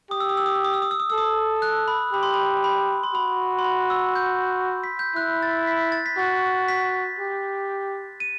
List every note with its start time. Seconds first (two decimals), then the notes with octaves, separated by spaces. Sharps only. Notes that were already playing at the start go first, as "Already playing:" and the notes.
0.10 G4 D#6
0.20 E6
0.29 D#6
0.37 E6
0.46 D#6
0.55 E6
0.64 D#6
0.74 E6
0.82 D#6
0.91 E6
1.00 D#6
1.10 A4 E6
1.18 D#6
1.62 F#6
1.88 B5
2.13 G4 B5
2.23 C6
2.34 B5
2.64 B5
3.03 C6
3.14 F#4 B5
3.59 C6
3.64 B5
3.90 E6
4.15 G6
4.84 B6
4.99 G6
5.16 E4 F#6
5.43 A6
5.67 B6
5.92 A6
6.06 B6
6.18 F#4 A6
6.68 B6
7.19 G4
8.20 D#7